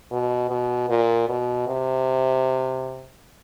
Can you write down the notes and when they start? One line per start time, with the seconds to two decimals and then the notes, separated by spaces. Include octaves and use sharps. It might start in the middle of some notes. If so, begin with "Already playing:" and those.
0.11 B2
0.50 B2
0.90 A#2
1.29 B2
1.68 C3